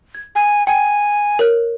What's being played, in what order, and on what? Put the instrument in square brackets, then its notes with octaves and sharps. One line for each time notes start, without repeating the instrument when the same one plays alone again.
[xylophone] G#6
[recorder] G#5
[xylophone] G5 [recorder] G#5
[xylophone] A#4 C#5 F#6